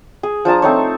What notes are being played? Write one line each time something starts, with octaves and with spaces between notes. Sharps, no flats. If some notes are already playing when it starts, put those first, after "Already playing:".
G#4
F3 D4 A5 A#5
A3 C4 D#4 C#5